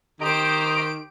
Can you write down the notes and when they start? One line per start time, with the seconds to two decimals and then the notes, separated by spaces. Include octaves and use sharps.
0.21 D#3 G4 C5 D#5 A#5 D7